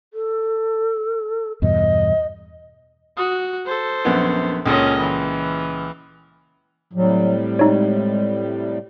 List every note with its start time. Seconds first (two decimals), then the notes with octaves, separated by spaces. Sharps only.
0.13 A4
1.62 E2 G2 B2 D#5
3.17 F#4 D#6
3.66 A4 C5
4.05 A#1 F#2 B3
4.66 C#2 A#2 C#4 A4 D#5
5.01 E3
6.93 A2 C3 F#3 G3
7.59 G#3 D#4 C#5